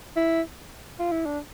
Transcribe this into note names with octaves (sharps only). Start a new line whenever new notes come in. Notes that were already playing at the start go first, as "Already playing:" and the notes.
E4
F4
E4
D4